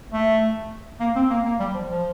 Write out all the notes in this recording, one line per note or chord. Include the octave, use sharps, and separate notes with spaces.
A3
A#3
C4
A#3
A#3
G3
F3
F3